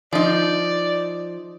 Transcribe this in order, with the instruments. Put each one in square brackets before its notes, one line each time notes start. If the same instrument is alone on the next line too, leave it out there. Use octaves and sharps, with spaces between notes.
[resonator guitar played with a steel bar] F3 D#4 [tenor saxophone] D5